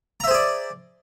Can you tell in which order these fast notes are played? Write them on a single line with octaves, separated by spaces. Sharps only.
A#5 E5 C5 G#4 D5